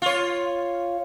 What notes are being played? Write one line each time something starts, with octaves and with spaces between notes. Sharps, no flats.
F4 C#5